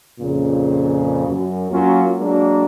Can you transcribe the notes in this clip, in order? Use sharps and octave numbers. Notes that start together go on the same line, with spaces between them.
F2 A#2 C#3
F#2
F#3 A#3 C#4 F4
F#3 G#3 A#3 D4